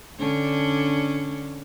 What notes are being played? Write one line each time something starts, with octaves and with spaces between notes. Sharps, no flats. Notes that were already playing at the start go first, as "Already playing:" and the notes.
D3 C#4 D4